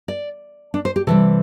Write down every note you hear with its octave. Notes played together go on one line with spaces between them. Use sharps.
D5
D4
C5
G4
C3 E3 G3 A4